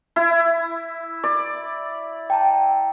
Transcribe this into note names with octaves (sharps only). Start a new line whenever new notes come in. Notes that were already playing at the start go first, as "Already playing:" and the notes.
E4
D5
G5 A5 A#5